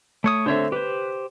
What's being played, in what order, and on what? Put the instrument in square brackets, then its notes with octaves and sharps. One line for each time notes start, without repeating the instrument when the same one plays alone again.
[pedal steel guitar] A3 C#5 D#6
[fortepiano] D3 A3 C4 [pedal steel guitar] C5 C#5 E5
[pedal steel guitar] G4 C5 [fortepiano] B4